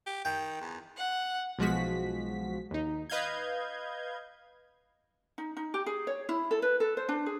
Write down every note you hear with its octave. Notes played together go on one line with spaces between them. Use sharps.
G4
D#3 G5
E2
F#5
B1 F3 G#3 F#4 B6
D#2 D#4
B4 D#5 F5 G6 G#6
D#4
D#4
G4
G#4
C#5
E4
A4
B4
A4
C5
D4
G#4